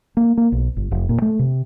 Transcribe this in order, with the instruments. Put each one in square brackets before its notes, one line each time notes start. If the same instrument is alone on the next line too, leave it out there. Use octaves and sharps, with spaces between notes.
[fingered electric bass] A#3
A#3
B1
G1
F1
A#2
A3
C3